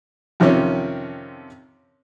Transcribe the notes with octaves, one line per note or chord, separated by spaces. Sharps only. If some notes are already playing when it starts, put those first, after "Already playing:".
F2 C3 D#3 F3 C#4